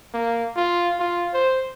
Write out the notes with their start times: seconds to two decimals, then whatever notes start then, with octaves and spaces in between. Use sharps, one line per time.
0.14 A#3
0.56 F4
1.00 F4
1.34 C5